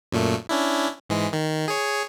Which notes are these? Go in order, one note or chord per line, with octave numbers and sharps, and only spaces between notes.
F#2 A#2 A3
C#4 D4 E4
G#2 E3 G#3
D#3
G#4 C#5